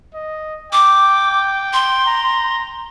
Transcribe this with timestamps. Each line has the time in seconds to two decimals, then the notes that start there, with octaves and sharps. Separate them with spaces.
0.15 D#5
0.73 G5 D6
1.73 C6
2.07 A#5